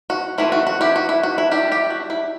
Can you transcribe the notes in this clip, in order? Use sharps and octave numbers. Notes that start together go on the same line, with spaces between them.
F#4
E3 A3 C4 E4
F#4
F#4
E4 G4
F#4
E4
F#4
E4
G3 D4 E4 G4
E4 G4
F#4
E4